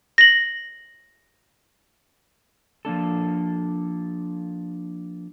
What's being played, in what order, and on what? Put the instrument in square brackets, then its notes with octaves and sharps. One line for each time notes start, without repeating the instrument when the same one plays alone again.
[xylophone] A#6 F#7
[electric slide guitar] F3 A#3 D4 A4